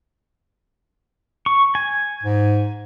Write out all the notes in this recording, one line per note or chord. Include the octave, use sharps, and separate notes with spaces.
C#6
G#5
G#2